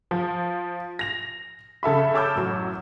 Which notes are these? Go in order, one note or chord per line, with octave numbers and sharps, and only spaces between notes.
F3
A#6 F7
C#3 A4 E5 B5
C#5 A5 D6 E6 F6 G6
A1 F#2 F#3